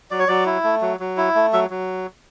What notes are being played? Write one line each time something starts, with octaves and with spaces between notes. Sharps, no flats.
F#3 D5
C#5
F#3 D5
E4
A3
F#3
F#3
E4
A3
F#3 E5
F#3